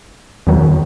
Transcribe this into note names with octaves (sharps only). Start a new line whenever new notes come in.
E2 D#3 F#3